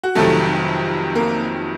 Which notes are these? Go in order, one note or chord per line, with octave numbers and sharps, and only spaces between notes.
F#4
F1 F2 C3 D#3 F#3 A3 A4
A#3 A#4